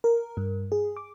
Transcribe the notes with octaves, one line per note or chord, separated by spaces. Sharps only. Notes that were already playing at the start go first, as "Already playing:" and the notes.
A#4
G2
G#4
D6